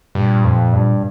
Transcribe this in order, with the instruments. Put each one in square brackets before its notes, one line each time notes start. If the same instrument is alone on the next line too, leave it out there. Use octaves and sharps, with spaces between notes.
[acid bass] G2 [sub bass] A#2
[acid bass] F2
G2